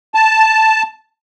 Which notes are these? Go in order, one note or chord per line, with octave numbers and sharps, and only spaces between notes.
A5